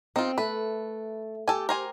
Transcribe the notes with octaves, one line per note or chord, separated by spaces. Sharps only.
C4 D#4 F4
A3 B4
G4 A4 G#5
A#4 C5 G#5